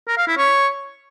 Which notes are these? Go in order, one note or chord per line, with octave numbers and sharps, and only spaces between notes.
A#4
F5
E4
C#5